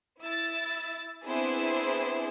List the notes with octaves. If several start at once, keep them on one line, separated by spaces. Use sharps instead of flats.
E4 E6 A6
B3 C4 D4 E4 G#4 C5